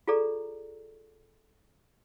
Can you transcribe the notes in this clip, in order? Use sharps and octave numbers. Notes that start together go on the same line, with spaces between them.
F4 G#4 A4 D5 A#5